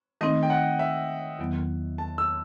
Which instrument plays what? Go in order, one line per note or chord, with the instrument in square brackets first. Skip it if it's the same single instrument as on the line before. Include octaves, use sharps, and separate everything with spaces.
[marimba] D#3 A3 C4 D#4 [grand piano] D#5
[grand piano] G5
F#5
E5
[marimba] E2 D#3 F#3 B3
[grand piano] A5
E6